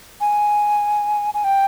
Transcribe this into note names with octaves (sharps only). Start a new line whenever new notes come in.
G#5
G#5
G5